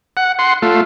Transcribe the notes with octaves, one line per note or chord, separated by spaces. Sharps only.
F#5
F#5 C6
A3 F4